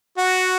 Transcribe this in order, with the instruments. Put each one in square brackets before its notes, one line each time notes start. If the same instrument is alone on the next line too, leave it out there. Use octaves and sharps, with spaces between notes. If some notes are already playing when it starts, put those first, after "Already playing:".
[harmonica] F#4 [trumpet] F#5